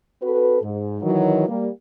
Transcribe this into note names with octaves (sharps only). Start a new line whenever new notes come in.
C4 F#4 A4 B4
G#2
D#3 E3 F#3
G3 A#3